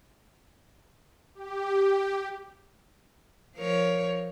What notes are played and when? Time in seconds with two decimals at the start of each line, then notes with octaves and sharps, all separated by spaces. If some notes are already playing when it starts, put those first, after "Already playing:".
1.35 G4
3.56 F3 A#4 C#5